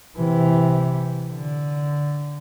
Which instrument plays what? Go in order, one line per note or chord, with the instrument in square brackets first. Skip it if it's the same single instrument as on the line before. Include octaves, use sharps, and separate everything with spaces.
[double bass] C3 E3
D3